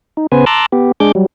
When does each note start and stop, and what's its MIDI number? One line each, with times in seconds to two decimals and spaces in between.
0.17 0.27 63
0.32 0.45 49
0.32 0.45 59
0.32 0.45 71
0.32 0.45 72
0.32 0.45 80
0.46 0.66 81
0.46 0.66 82
0.46 0.66 84
0.46 0.66 86
0.46 0.66 88
0.46 0.66 90
0.72 0.92 59
0.72 0.92 67
1.00 1.12 56
1.00 1.12 62
1.00 1.12 68
1.00 1.12 86
1.00 1.12 91
1.15 1.26 54
1.15 1.26 55